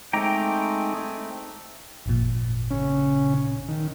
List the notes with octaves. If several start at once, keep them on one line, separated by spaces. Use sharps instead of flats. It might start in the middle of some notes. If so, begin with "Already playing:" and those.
G#3 A3 C4 D#4 G5 A#5 D6
G#1 F2 A#2
C#3 C#4
D#3